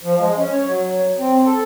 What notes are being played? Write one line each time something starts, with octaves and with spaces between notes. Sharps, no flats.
F3
G#3
C#4
C#5
F#3
C4
A4